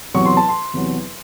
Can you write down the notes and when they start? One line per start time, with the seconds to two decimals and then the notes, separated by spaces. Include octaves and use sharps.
0.14 E2 C3 F#3 C#6
0.26 C6
0.37 A5
0.49 C6
0.74 E2 C3 F#3